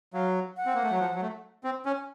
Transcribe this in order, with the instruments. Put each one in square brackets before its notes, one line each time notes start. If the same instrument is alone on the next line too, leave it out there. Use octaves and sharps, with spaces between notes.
[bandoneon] F#3 [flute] F5
[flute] F#5
[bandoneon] C4
A#3
A3
F#3
F3
F#3
A3
C4
C#4